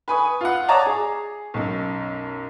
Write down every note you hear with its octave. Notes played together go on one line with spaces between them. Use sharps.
B4 G#5 B5 C#6 D#6
F4 F#5
C#5 D5 A5 A#5 D6 D#6
G#4
B1 F#2